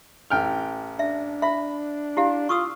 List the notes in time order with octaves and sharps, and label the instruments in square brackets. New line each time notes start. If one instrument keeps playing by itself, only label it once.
[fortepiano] A1 G5 F6
[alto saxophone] D4 [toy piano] E5
[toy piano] E5 [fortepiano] B5
[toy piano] E4 G4 F5
[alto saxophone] F4 [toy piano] C#6 D#6 E6